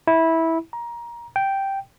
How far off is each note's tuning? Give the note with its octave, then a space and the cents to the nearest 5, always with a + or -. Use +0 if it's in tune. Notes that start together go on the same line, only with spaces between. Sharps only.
E4 -15
A#5 +20
G5 -5